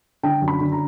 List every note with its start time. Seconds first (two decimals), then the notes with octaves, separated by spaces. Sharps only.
0.23 D3 G5
0.42 F#2
0.48 B5
0.60 D3
0.72 A#5